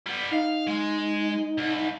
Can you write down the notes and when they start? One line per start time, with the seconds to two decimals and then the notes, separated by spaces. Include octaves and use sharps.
0.06 G3 B3
0.31 D#4 F5
0.67 G#3
1.58 C2